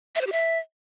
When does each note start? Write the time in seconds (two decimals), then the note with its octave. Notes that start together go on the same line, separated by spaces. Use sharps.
0.15 E5
0.21 C5
0.27 G4
0.32 E5